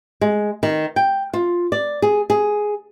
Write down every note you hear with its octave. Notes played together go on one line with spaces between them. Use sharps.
G#3
D#3
G5
F4
D5
G#4
G#4